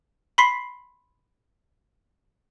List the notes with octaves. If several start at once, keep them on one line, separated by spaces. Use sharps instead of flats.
B5 C6 B6 C7